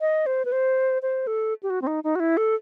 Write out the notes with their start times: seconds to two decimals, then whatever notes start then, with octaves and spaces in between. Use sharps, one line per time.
0.01 D#5
0.26 C5
0.45 B4
0.52 C5
1.02 C5
1.27 A4
1.63 G4
1.70 F#4
1.82 C4
1.87 D#4
2.04 D#4
2.15 F#4
2.20 E4
2.37 A4